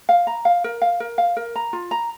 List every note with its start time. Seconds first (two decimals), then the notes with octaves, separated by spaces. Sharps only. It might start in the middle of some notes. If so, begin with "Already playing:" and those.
0.09 F5
0.27 A#5
0.45 F5
0.64 A#4
0.82 F5
1.00 A#4
1.18 F5
1.37 A#4
1.56 A#5
1.73 F4
1.91 A#5